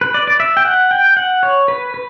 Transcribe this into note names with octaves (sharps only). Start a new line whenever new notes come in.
B4
D5
D5
E5
G5
F#5
G5
F#5
C#5
B4
B4